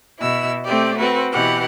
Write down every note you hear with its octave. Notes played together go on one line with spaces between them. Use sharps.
B2 E4 E6
A3 C4 G4 D5
C4 F#4 B4
B2 E3 G4 F#5